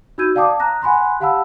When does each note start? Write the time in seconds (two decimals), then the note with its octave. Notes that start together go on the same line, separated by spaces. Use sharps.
0.18 D#4 F#4 E6 G6 G#6 D#7
0.35 D5 F5 G5 A5 D6 D#6
0.60 A#5 F#6 A#6
0.82 F#5 G#5 B5 C6 F#6
1.20 G4 F5 F#5 A5 B5 E6